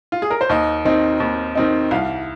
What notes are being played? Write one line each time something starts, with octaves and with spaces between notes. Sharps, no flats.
F4
G#4
A#4
C5
D#2 D#5
D#3 C4 D#4
D#2
D#3 C4 D#4
C2 F5